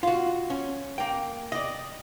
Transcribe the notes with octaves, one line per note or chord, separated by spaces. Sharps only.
F4 F#4
C#4
A#3 G5
D5 D#5